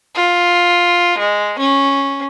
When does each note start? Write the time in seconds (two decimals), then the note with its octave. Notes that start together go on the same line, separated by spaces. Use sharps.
0.15 F4
1.18 G#3
1.58 C#4